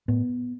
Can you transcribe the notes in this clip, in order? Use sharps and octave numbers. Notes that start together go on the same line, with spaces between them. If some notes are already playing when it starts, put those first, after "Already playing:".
A2 B3